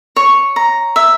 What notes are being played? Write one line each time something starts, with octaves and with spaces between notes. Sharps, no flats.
C#5
A#5
E5